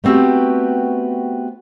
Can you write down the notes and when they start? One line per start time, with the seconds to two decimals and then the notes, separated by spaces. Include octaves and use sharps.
0.04 A3 B3 C4 F#4 G4